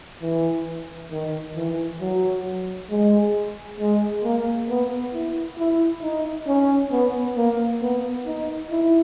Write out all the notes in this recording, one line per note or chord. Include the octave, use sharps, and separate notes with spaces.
E3
D#3
E3
F#3
G#3
G#3
A#3
B3
E4
E4
D#4
C#4
B3
A#3
B3
D#4
E4